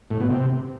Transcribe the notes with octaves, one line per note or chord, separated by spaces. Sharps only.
A2
B2
C3